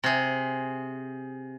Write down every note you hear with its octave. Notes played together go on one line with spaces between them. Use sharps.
C3 G#4